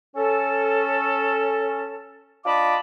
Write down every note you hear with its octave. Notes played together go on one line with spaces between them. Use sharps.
C#4 A4
D4 F4 D#5 A5 B5 D6